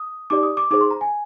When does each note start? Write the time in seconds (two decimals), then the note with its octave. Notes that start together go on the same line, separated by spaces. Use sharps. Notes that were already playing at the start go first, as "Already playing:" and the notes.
Already playing: D#6
0.30 D#4 G4 D5 D6
0.43 D#6
0.57 D6
0.71 D#4 G#4 C5 D6
0.81 C6
0.91 A#5
1.01 G#5